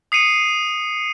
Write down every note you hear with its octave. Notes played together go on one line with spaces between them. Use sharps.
D#6 C7 C#7 D#7